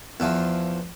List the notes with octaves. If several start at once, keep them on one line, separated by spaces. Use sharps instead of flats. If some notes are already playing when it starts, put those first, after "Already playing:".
E2 F3